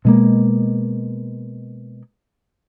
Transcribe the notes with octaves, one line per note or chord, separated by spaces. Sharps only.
B2 G#3 A#3